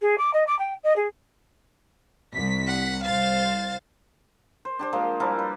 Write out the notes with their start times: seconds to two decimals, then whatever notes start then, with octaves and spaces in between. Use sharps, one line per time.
0.01 G#4
0.18 D6
0.33 D#5
0.47 D6
0.58 G5
0.83 D#5
0.96 G#4
2.34 C2 B6
2.68 F#5
3.05 C2 C5 F5 A6
4.65 C5
4.79 D4 G4 C5
4.93 F3 G#3 A#3
5.20 F3 G3 E4 A#4
5.39 B4